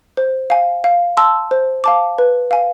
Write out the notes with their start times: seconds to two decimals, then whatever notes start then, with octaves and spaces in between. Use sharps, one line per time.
0.17 C5
0.50 F5 G#5
0.84 F5
1.17 A5 C6 E6
1.51 C5
1.84 F5 A5 D6
2.18 B4
2.51 F5 G#5